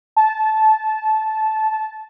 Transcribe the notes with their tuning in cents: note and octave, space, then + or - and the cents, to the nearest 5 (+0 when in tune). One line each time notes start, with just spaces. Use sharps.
A5 -15